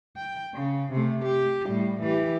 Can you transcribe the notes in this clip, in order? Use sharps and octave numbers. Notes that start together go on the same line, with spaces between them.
G5
C#3
C3 A3
G4
A2 G3
E3 G4